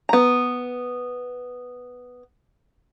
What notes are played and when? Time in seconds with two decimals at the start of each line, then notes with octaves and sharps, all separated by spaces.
0.09 B3 A#5